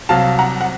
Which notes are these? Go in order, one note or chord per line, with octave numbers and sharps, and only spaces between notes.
C2 C3 F#3 F5 A5
F#5 A#5
F#5